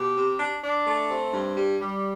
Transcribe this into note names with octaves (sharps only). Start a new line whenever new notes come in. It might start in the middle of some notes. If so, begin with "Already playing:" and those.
Already playing: B2 G4
C3
D4
D4
A3
C4
G2
G3
G3